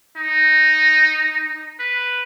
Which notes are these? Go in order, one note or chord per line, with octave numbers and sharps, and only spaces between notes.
D#4
B4